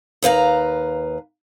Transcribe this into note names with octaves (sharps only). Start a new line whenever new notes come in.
D#2 B4 F5 A#5